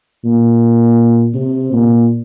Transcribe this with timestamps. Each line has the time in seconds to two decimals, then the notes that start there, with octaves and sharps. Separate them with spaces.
0.24 A#2
1.35 C3
1.72 A#2